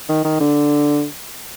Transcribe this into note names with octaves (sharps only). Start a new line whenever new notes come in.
D#3
D#3
D3